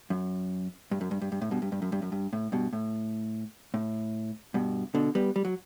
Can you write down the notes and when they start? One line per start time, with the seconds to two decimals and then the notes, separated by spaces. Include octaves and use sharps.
0.10 F#2
0.91 G2
1.01 F#2
1.11 G2
1.22 G2
1.32 G2
1.41 A2
1.51 G2 B2
1.62 G2
1.72 G2
1.82 F#2
1.92 G2
2.02 F#2
2.12 G2
2.33 A2
2.52 G2 B2
2.73 A2
3.74 A2
4.54 G2 B2
4.95 B2 D3
5.15 G3 B3
5.36 G3
5.45 F#3